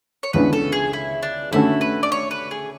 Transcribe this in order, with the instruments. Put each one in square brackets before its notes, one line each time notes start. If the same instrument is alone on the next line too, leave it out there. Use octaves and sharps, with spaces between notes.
[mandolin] C#5
[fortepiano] C#2 C#3 E3 B3 D4 [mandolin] B4
[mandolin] A4
G#4
E4
D4
[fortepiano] D3 A3 C#4 F#4 A4 [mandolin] E4
[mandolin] B4
D5
C#5
B4
G#4